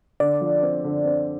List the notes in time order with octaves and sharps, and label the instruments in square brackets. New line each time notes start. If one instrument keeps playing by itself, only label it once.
[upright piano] D3 [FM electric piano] D5
[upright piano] F3
C4
D3
C4